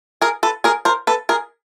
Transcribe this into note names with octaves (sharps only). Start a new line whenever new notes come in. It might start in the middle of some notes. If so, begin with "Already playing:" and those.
G#4 A#4
A4 B4
G#4 A#4
A#4 C5
A4 B4
G#4 A#4